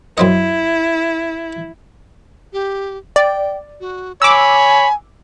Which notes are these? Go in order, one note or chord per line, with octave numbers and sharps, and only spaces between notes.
F#2 C4 E4 D#5
G4
D5 G5
F#4
C#5 G#5 B5 D6 E6